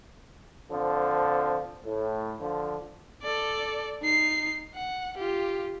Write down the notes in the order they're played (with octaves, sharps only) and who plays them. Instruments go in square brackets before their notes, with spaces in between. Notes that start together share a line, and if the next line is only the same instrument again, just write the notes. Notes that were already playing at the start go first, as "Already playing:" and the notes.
[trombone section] D3 F3 C4
A2
D3 F3
[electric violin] A4 D5
D#4 C7
F#5
F4 G4